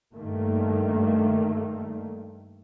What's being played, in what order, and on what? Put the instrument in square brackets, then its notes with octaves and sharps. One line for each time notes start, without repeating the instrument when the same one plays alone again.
[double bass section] G2 D#3 A3 A#3